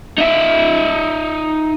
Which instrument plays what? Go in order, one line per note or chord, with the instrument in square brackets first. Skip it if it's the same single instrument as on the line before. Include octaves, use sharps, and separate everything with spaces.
[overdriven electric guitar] D#4 E5